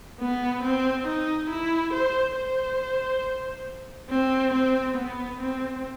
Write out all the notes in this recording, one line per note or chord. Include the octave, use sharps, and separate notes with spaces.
B3
C4
D#4
E4
C5
C5
C4
C4
B3
C4